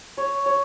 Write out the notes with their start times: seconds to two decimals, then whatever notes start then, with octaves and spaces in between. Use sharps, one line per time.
0.17 C#5
0.46 C#5